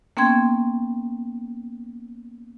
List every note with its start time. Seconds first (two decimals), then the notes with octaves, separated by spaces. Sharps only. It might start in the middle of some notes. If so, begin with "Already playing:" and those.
0.17 A#3 B3 C#4 G5 C6 G#6